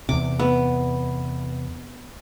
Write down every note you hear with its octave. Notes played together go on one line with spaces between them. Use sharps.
E2 C3 D6
B3